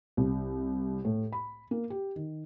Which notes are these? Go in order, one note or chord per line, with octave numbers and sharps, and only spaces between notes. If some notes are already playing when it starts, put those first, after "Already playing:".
C2
A2
B5
A#3
G4
D#3